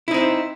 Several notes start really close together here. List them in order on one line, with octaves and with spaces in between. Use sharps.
E4 D#4 C4